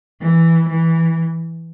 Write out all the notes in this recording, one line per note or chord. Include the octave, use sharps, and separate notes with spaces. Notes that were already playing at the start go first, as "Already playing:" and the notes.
E3
E3